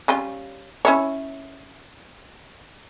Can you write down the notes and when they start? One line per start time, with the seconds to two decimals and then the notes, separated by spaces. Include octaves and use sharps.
0.08 G3 C#4 F4
0.85 C#4 E4 C#5